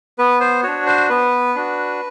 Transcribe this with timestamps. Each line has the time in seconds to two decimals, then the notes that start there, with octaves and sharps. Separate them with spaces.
0.19 B3 B4
0.40 C5
0.63 D4 F#4 C#5
0.86 C5
1.09 B3 B4
1.55 D4 F#4